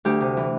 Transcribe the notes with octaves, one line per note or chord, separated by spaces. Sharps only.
D2 G4
C3
E3